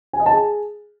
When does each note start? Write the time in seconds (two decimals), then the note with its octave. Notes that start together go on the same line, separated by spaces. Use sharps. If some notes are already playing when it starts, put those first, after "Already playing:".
0.13 G#5
0.20 D#5
0.26 A5
0.32 G#4